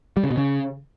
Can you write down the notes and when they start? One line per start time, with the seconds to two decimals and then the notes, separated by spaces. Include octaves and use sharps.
0.17 G3
0.24 C#3
0.30 B2
0.37 C#3